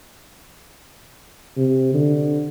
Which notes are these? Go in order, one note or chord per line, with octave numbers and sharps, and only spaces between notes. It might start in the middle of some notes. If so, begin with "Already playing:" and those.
C3
D3